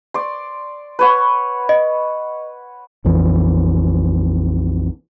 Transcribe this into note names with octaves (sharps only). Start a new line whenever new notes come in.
D5 C6
B4 C#5 F#5
D#5
A#1 F2 E3